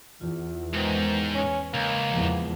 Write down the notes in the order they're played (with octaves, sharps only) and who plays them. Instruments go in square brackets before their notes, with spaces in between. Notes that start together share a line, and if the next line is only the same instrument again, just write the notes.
[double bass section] E2 [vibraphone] F4
[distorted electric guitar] G#2 [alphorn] D#3 [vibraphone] G#3 B4 C5
[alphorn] C#4 [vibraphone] B4
[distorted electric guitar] C#2 [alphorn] A#3
[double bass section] E2 F3 B3 [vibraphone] G#3